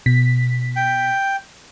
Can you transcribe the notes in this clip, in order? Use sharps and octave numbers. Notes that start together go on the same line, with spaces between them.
B2 B6
G5